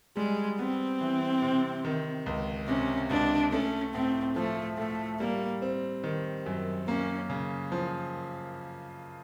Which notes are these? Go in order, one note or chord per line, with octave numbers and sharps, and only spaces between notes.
G3 G#3
B3 C4
E3
C3
D#3
C#2
C3 C#4
C#2 D4
A3 C#4
A2 C4
F3 A3
A2 A3
G3 A#3
C4
D#3
F#2
A#3 C#4
C#3
F3